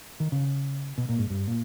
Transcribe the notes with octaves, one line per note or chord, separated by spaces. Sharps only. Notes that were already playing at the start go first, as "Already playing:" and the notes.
D#3
C#3
B2
A#2
G#2
G2
A#2